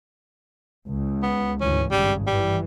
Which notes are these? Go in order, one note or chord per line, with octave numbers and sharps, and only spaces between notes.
C#2
B3
D2 G#2 E3 C#4
G#1 G2 C#3 G3
G2 E3 G3